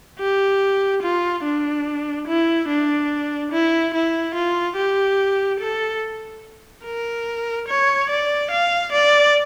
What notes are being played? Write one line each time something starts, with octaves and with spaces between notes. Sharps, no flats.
G4
F4
D4
E4
D4
E4
E4
F4
G4
A4
A#4
C#5
D5
F5
D5